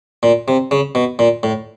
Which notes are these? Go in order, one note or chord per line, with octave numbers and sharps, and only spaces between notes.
A#2
C3
C#3
B2
A#2
A2